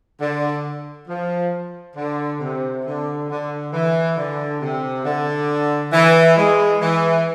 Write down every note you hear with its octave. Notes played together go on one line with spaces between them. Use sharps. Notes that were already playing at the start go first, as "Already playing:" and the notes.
D3
F3
D3
C3
D3
D3
E3
D3
C3
D3
E3
E3 G#3
E3